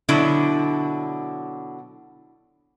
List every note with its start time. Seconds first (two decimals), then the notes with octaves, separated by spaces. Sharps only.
0.08 B2 D3 F#3 D4 E4